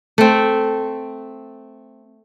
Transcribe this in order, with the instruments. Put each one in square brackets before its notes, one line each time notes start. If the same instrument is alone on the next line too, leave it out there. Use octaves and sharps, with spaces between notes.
[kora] A3 C4